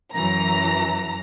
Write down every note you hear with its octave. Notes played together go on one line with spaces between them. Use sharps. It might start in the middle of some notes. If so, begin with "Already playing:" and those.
F#2 E3 A#5